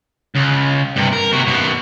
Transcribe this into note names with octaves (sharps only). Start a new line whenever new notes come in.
C#2
G2 C3
A#4
C3 F#4
F#2 B2